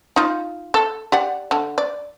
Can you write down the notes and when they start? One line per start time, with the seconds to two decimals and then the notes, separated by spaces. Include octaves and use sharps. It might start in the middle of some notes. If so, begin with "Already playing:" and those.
0.16 D#4 F4
0.74 A4
1.12 G4 D5 F#5
1.51 D3
1.78 D5